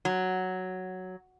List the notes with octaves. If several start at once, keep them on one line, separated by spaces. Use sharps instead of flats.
F#3